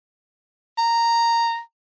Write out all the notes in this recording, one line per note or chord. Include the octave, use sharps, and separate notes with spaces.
A#5